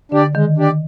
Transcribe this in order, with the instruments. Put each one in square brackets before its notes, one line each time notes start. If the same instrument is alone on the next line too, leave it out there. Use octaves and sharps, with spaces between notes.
[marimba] D3 [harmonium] D4 G4 D5
[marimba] D#3 [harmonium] G#3
[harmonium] D4 G4 D5